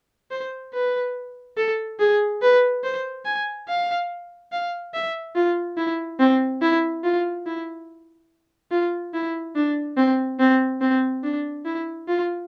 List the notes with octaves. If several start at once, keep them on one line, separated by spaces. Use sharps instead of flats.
C5
B4
A4
G#4
B4
C5
G#5
F5
F5
E5
F4
E4
C4
E4
F4
E4
F4
E4
D4
C4
C4
C4
D4
E4
F4